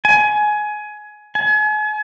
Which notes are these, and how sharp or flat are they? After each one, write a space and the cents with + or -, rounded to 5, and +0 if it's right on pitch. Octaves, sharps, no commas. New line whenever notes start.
G#5 +20
G#5 +40